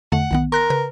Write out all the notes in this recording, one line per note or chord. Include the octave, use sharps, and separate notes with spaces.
E2 D3 A3 F#5
B1 D#3 B3
A#4 C6 F#6 A#6
C#3 B4